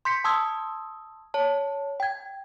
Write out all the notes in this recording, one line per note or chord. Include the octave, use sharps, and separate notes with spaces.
C6 G6 B6 C#7
A5 C6 D#6 E6 G#6
C#5 A5
G5 G#6